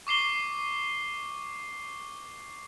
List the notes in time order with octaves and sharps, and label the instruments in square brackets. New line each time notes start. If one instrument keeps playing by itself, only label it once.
[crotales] C#6 D6 C7 G7